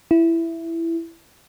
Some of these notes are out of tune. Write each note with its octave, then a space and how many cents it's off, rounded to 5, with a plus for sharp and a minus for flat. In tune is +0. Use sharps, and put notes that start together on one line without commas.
E4 +10